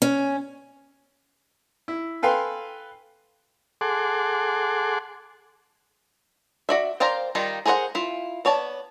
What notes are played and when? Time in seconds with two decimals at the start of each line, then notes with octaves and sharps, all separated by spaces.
0.02 C#4
1.88 E4
2.23 A4 B4 F5 G5 G#5 C6
3.81 G#4 A4 F#5 C6 D6
6.69 F#4 D5 E5
7.00 A#4 C5 D5 F5 G5
7.35 D#3 G3 D#4 F4
7.66 G#4 A#4 C5 C#5 F#5
7.95 E4 F4
8.45 B3 C#5 D5 A5